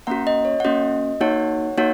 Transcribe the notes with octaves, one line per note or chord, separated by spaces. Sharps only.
A#3 C#4 F#4 F#5 A#5
D#5
C#5
F#5
A#3 C#4 F#4 D#5
A#3 D#4 F#4 C#5 F#5
A#3 D#4 F#4 C#5 F#5